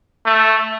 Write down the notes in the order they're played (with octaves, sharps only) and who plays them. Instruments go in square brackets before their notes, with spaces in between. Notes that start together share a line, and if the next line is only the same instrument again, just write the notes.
[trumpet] A3